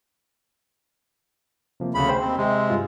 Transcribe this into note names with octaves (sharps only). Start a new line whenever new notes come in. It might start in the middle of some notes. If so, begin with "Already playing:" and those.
C3 F3 A#3
D2 C#3 B5
C5 G5
D#2 C4
C3 G#3
G2 F4